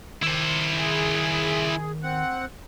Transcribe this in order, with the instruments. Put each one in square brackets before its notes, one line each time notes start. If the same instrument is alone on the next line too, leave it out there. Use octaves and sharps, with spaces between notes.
[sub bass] D#3 [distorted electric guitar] E4 C5
[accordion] G#4
C4 F#5